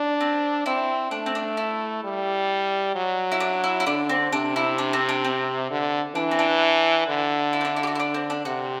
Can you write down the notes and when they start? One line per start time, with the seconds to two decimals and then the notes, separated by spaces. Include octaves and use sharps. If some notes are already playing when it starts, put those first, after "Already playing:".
Already playing: D4
0.21 C4
0.66 C4 E4
1.11 A3 D4
1.26 C4
1.35 D4
1.57 E4
2.04 G3
2.95 F#3
3.32 E4
3.40 D4
3.64 E4
3.80 E4
3.87 D3 D4
4.09 C4
4.32 C3 D4
4.56 E4
4.78 D4
4.93 C4
5.09 D4
5.25 C4
5.71 D3
6.15 E3 D4
6.31 C4
6.39 D4
7.08 D3
7.53 E4
7.61 C4
7.65 D4
7.76 E4
7.83 G4
7.87 F#4
7.95 E4
8.00 D4
8.14 C4
8.30 D4
8.45 C3 F#4